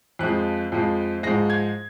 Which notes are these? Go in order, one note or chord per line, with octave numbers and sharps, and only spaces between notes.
F2 F3 G#3 F#6
F2 F3 G#3
G#2 F3 G#3 A#6
G#6